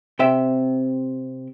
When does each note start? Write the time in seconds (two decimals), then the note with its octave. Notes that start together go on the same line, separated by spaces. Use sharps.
0.19 C3 C5 E5 G5